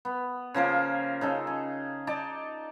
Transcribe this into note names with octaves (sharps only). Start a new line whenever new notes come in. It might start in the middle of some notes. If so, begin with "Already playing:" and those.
B3
C#3 F3 A#3 A#4
C#3 D#4 A4
G#4
D#4 D5 A5